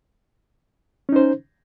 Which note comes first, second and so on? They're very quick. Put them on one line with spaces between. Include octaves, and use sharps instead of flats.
C#4 D#4 C5